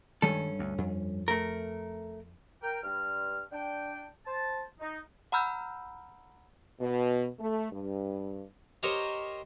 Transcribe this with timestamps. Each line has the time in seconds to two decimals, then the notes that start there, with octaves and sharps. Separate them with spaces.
0.22 G2 D#3 G3 G#3 C#4 A4
0.59 D2
0.78 F2
1.28 A3 A#4
2.62 A#4 G5
2.83 G2 F6
3.52 D4 G5
4.26 C5 A5
4.80 D#4
5.32 F#5 A#5 B5 E6 F6 G6
6.80 B2
7.39 A3
7.72 G2
8.83 G4 A#4 C5 C#5 D#5